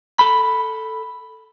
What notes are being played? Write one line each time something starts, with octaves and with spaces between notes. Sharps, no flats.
A4 B5